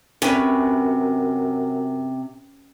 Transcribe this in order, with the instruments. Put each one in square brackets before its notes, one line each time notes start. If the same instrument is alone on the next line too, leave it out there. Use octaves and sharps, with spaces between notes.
[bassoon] F#2 [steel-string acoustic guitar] C3 [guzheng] C#4 B4 C#5